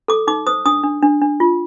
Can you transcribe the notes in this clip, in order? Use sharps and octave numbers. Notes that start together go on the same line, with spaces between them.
A4 D6
D#4 D6
C5 D#6
D4 D#6
D4
D4
D4
F4